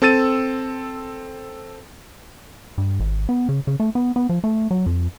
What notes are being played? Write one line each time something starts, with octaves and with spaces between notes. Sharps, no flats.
C4 A4 E6 A6 D#7
G2
G#1
B3
C#3
C#3
A3
B3
B3
F3
A3
F#3
F2